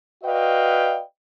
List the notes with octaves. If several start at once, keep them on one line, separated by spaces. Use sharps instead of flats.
F#4 B4 D5 D#5 F5 G5